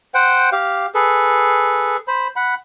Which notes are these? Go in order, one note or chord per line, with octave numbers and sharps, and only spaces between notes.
C5 F#5 G5
G4 F5
G#4 A4 B4
C5 B5
F#5 B5